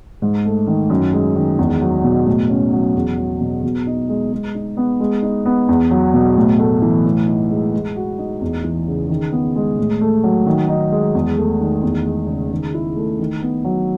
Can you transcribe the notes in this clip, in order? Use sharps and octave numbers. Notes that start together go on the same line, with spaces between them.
G#2
A3
D#3
F#2
G#3
D#3
E2
F#3
B2
A2
C#4
F#3
E2
F#3
B2
B2
D#4
G#3
G#3
D#4
B3
G#3
D#4
B3
E2
F#3
B2
A2
A3
E3
A2
D#4
G#3
G#3
F#4
D#4
E2
E3
C#3
D#3
B3
G#3
A2
A3
F#3
D#3
D#4
G#3
E2
A3
D#3
E2
G#3
C#3
D#3
E4
A3
D#3
B3
F#3